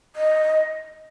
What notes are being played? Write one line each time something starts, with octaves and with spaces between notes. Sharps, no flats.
D#5